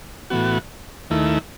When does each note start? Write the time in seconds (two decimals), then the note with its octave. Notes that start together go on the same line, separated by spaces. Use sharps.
0.30 A2 E3 B3 F#4
1.10 D#2 D#3 A3 E4